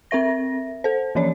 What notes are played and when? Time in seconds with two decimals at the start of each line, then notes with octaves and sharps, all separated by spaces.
0.11 C4 A#4 E5 A#6
0.84 A4 C5
1.15 E3 F3 A#3 C#4 C#5 D5